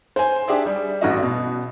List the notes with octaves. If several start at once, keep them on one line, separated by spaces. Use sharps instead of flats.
C5 G#5
D4 G4 G#4 D5 E5
G3
A1 F#4 D#5
B2